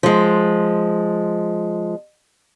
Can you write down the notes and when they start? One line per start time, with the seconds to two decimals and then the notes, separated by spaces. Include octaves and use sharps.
0.03 F3 G#3